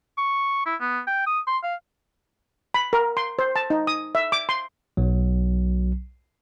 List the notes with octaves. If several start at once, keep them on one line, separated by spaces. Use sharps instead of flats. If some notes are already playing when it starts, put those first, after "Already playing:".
C#6
E4
B3
G5
D#6
C6
F5
B5
A#4
C6
C5
A5
D#4
D#6
E5
D6
C6
B1 F#3